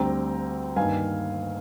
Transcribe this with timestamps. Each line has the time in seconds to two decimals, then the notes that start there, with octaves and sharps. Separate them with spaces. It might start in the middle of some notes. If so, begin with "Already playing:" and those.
Already playing: D2 D3 G3 C4 G5 A#5
0.76 G2 D#3 A#3 F5 G#5